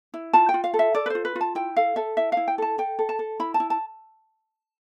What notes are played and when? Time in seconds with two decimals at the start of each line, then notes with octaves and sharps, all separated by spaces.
0.14 E4
0.33 F4 A5
0.49 G5
0.54 F4
0.64 F5
0.74 A4
0.79 E5
0.95 A4 D5
1.06 B4
1.10 F4 C5
1.25 B4
1.36 F4
1.41 A5
1.55 E4 G5
1.77 A4 F5
1.96 A4 E5
2.17 E4 E5
2.32 E4 F5
2.48 G5
2.58 A4 A5
2.78 A4 G5
2.99 A4
3.09 A5
3.19 A4
3.40 E4 B5
3.54 A5
3.60 E4
3.70 A5